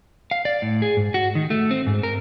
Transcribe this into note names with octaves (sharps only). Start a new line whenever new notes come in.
F5
D5
A2
G#4
G#2
F#4
D#3
A3
C4
G#2
A#4